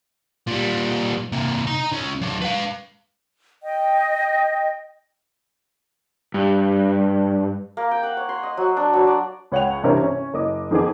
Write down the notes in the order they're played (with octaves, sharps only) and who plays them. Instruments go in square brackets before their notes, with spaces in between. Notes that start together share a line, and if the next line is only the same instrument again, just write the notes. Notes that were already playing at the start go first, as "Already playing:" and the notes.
[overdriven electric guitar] A#2 G3
C3 A#3
D#4 A#5
C#2 C#4
F#3 D4
B4 F5
[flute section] D#5 G5
[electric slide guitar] G2
[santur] A#3
G5
F#5
C#5
C6
D#5
F#3
D4
F#3
D5
[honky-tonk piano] C#2 C#5 F#5 G5 F7
A1 G2 C3 C#4 A#4 C5
C#4
F#1 D#5 D6
F2 D#3 B3 G#4 D6